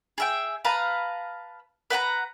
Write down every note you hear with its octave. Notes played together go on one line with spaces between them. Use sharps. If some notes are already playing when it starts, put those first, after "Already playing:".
G#4 E5 G5
B4 F5 A5 A#5
B4 F#5 G5 A#5